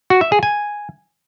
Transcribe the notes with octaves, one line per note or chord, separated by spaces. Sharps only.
F#4
E5
G#4
G#5